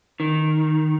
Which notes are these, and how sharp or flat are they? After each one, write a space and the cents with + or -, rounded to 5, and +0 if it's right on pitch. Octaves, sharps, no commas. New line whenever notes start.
D#3 -5